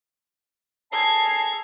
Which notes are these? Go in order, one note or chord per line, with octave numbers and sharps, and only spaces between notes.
G#4 A4 A5 A#5 G#6 C7